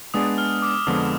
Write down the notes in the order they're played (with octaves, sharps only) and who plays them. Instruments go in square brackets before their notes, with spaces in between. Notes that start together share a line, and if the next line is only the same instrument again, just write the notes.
[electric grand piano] G#3 B3 D4 G#4 D5 [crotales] D#6
[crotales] F6
D6
[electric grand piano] F2 D3 F3 G#3 B3 [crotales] D#6